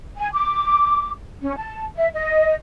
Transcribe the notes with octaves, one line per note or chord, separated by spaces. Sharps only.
G#5
D6
C#4
A5
E5
D#5